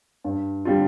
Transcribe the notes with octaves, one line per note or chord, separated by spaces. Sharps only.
G2
D3 G3 C4 F4